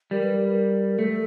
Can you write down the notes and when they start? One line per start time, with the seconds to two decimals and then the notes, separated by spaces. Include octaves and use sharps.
0.11 G3 A#4
0.23 B4
0.35 A#4
0.99 A3 A4